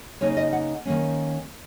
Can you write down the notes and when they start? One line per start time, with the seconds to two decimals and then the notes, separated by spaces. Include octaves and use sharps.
0.21 C#3 A#3 D#4 C#5
0.37 D#5
0.53 F#5
0.85 D#3 A#3 C#4